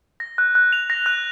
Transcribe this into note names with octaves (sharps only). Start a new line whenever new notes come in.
A#6
F#6
F#6
F7
A#6
F#6